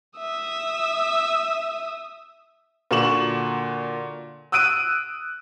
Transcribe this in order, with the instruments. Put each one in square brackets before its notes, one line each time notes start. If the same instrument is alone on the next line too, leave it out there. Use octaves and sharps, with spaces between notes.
[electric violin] E5 D#6
[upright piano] A#2 D3 F#4 C#6 E7 F#7
D#6 E6 F#6 D7 D#7